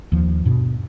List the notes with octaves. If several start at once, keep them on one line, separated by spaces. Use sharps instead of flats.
D#2 F3
G2 B2